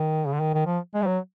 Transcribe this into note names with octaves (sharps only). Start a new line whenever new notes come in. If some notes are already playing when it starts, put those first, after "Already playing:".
Already playing: D#3
C#3
D3
D#3
D#3
F3
G#3
G3
F#3